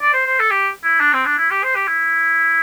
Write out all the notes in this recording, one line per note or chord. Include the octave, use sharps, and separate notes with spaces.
D5
C5
C5
A4
G4
E4
D4
C4
D4
E4
G4
C5
G4
E4